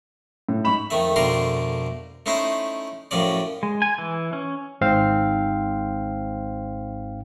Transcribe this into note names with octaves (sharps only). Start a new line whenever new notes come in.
A2
G#2 B5 C#6 E7
F2 D#3 A3 E5
F2 B2 D3 A3 A#4 C6
A3 C#4 D#4 E4 C5
F#2 A2 F3 C#4 D5
G#3
G#5
E3
C#4
G#1 G#2 C4 C5 F5